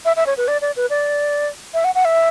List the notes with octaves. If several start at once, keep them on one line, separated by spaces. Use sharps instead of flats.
E5
E5
C#5
B4
D5
D5
B4
D5
E5
F#5
F#5
E5